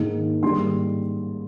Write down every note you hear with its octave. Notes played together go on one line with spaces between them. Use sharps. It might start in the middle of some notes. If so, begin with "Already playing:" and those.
Already playing: G#2 D#3 A#3
G#2 D#3 G3 A#3 C6